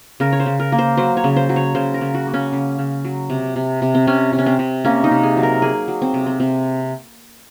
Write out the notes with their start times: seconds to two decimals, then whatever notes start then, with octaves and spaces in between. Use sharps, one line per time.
0.20 C#3 A#4
0.32 C#5
0.40 C5
0.46 C#3
0.60 A#4
0.72 A#3
0.78 C5
0.97 F#3 C5
1.17 C#5
1.24 C#3
1.36 C5
1.49 F#3
1.56 C#5
1.75 C#3 C5
1.94 A#4
2.01 C#3
2.14 F#4
2.27 A#3
2.34 C#4
2.53 C#3
2.79 C#3
3.05 F#3
3.30 C3
3.56 C3
3.82 C3
3.94 C4
4.07 C3 C#4
4.33 C3
4.38 C#4
4.46 C4
4.59 C3
4.84 A#3 C#4
5.04 D#4
5.11 C3
5.23 G#4
5.37 F#3
5.43 A#4
5.62 A#3 G#4
5.88 F#3
6.02 C4
6.14 C3
6.26 C4
6.40 C3 C4